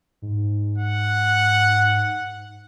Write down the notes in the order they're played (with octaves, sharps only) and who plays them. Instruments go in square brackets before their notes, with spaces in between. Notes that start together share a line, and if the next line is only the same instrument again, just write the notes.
[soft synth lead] G#2
[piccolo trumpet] F#5